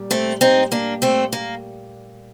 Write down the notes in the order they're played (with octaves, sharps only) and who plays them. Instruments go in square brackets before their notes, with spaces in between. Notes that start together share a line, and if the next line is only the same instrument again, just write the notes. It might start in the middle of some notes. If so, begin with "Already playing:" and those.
Already playing: [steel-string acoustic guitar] A#2 G3
A3 C4
C4 D#4
A#3 D4
A3 C4
A#3